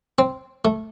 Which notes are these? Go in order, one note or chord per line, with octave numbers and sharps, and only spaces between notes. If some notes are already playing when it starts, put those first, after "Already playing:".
C4
A3